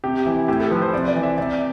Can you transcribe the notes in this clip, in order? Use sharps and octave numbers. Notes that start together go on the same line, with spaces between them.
C3 G4
E3 E4
A2 G4
A4
F3 B4
C5
C3 D5
D5
E3
E5
C3 D5